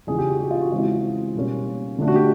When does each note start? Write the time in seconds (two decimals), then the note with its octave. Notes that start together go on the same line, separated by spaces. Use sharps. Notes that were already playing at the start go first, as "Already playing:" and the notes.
0.07 E2 C#3 F3 G#4
0.18 G4
0.30 F#4
0.39 G4
0.51 F4
0.61 F#4
0.72 C#3 E3 G#3 C4 E4 F4
1.35 B2 G3 A#3 C#4
1.98 D3 F3 A3 D4
2.08 F#4
2.15 G4